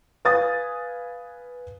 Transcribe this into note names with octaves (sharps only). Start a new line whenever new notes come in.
B4 F5 G#5 D#6 A6